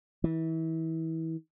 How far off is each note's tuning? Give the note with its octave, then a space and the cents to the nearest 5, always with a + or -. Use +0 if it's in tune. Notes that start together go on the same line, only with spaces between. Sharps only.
E3 -30